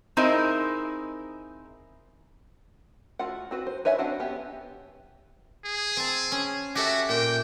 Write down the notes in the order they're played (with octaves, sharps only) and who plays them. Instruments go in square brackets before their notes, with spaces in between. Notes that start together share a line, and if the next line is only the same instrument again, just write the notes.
[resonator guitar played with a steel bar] C4 D#4 E4 G#4 A#4 C5
[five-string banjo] A3 F4 F#4 F#5
C4 F#4 B4
C5
B4 C#5 E5 F#5 G#5
C4 D4 F#4 B4 F#5
B3 C#4 G4
[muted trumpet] G#4
[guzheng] C4 A5
C#4
[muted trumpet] F#4 [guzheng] G4 A4 E5
[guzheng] A#2 [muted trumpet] G5